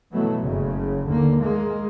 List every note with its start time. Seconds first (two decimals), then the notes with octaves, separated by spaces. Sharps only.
0.13 B2 E3 F#3 A3 B3
0.43 F#1 C#3
1.08 D#2 D3 A#3
1.40 G#3 A#3